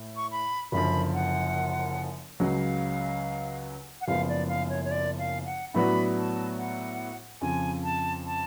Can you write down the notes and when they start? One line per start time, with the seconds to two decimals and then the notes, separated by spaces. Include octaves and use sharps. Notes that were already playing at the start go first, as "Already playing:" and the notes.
Already playing: A2
0.16 C#6
0.32 B5
0.72 F#1 F#2 D3 F3 B5
1.14 F#5
2.40 C#2 C#3 F#3 F5
4.01 F#5
4.07 F#1 F#2 F3 G#3 B3 F5
4.29 D5
4.49 F5
4.70 C#5
4.85 C#5
4.91 D5
5.19 F5
5.46 F#5
5.74 A2 F#3 B3 D4 F#4 B5
6.17 A5
6.58 F#5
7.41 F2 C#3 F3 G#5
7.84 A5
8.26 A5